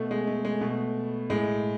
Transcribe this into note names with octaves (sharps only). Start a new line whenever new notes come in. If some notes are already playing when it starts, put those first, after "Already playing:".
Already playing: B2 A3
G#3
A3
G#3
B2 A3
A2 G#3